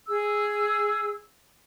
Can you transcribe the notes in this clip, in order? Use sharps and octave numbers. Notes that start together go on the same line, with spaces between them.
G#4 E6